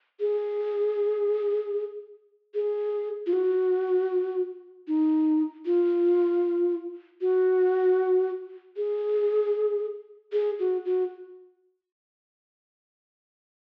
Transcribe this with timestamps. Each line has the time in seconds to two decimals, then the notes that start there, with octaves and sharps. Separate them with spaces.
0.20 G#4
2.55 G#4
3.26 F4
3.33 F#4
4.88 D#4
5.66 F4
7.21 F#4
8.77 G#4
10.33 G#4
10.60 F#4
10.85 F#4